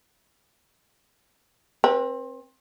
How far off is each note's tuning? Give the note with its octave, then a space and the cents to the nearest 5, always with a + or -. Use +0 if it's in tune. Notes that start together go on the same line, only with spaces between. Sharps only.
C4 +25 B4 -30